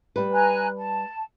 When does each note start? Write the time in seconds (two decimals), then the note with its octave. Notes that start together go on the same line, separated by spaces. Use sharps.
0.16 G3 B4
0.32 G#5 A#5 F#6
0.77 A5